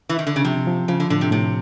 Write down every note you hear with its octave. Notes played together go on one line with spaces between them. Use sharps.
E3
D#3
D3
C#3
C3 F3
F3
C#3 F3
D3
A2 D3
C3
A2 C3